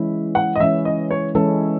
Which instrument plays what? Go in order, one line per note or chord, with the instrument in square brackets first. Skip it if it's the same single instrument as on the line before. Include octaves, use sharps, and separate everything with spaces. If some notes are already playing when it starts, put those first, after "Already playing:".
Already playing: [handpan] E3 G#3 C#4 E4
[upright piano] F#5
D#5
[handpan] E3 G#3 C#4 E4 [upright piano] E5
[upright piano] D#5
C#5
[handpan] E3 G#3 C#4 E4 [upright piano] A4